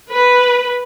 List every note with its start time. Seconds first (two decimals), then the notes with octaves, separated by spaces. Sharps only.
0.11 B4